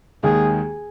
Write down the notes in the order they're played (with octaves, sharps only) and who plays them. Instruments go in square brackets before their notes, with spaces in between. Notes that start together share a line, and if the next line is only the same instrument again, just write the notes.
[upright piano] D#2 D#3 G#3 [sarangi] G#4